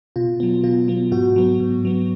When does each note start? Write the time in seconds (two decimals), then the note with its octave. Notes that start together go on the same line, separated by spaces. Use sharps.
0.16 B2 F4
0.40 F#3 B3
0.64 B2 F4
0.88 F#3 B3
1.12 G#2 F#4
1.36 F#3 B3
1.60 G#2
1.85 F#3 B3